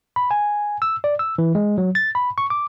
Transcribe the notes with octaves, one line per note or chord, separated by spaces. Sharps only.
B5
G#5
E6
D5
E6
E3
G#3
F#3
A6
B5
C#6
D6